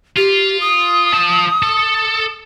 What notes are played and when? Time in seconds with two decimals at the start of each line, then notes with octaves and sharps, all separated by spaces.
0.16 F4 G4
0.60 D#6
1.13 F3 A5
1.63 A4